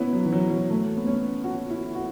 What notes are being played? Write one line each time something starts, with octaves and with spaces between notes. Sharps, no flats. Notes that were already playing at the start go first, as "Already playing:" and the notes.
Already playing: B3 C#4 E4
F#3
E3
F#3
F#3
A3
B3
C#4
F#4
E4
F#4